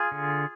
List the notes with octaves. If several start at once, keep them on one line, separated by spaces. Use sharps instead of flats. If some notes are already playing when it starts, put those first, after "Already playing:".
Already playing: F4 G#4
D3